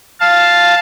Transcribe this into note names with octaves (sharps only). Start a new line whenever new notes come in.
F5 A5